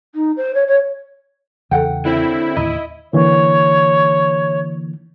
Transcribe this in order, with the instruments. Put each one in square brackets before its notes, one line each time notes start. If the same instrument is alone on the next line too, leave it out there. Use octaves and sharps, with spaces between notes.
[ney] D#4
C5
C#5
C#5
[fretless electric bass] E2 C#3 E3 [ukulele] A4 F#5 G5
[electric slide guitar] D3 C4 [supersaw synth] E4
[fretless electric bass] D#2 A2 D3 [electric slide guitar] D#5 [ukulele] B5
[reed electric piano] D3 E3 A#3 [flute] C#5